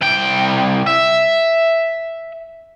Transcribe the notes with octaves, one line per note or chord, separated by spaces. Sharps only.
C2 G5
E5